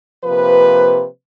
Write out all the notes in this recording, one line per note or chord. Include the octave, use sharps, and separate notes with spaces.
C3 F3 A#3 B4